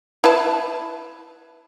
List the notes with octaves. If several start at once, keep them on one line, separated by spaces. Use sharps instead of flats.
E4 B4 A5